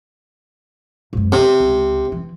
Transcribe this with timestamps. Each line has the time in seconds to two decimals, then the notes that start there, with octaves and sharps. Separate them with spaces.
1.13 G#1 F#2
1.32 C3 C4
1.60 C#2
2.12 E3